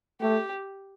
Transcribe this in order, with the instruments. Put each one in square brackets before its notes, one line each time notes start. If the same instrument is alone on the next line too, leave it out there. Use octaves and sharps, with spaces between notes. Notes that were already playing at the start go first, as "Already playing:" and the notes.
[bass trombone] A3 [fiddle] G4